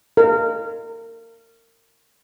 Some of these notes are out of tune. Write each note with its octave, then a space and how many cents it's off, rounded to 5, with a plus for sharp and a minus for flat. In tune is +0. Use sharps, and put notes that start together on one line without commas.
A#4 -30